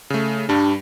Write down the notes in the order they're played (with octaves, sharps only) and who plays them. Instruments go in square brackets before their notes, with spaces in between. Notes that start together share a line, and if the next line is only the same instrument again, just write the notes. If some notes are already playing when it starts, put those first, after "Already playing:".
[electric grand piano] C#3 A3
[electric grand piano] G2 G3 [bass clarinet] D4